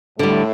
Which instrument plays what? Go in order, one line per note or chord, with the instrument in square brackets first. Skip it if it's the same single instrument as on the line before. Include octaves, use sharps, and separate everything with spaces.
[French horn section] A2 A3 [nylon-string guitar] D3 G3